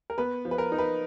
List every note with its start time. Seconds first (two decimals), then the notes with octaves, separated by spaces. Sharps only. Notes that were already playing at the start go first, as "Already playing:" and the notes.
0.10 A#4
0.18 B3 B4
0.45 F3
0.51 B4
0.58 A#4
0.72 D#4
0.78 B4